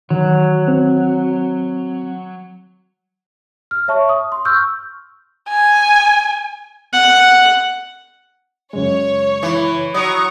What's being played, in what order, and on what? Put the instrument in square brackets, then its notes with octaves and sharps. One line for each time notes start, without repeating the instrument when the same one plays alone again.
[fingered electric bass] D#3 E3 [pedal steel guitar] F#3
[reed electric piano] C4
[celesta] F6
C#5 E5 A5 C#6
D#6
C6
C#6 E6 F6 G6
[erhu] G#5
[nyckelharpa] F#5
[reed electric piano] F#2 C#3 G#3 [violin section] C#5
[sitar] E3
[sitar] F#3 [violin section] A#5 C#6 [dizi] D#6